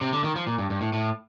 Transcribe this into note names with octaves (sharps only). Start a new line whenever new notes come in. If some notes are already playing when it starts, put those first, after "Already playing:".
C3
D3
D#3
F3
A#2
G2
G2
A2
A2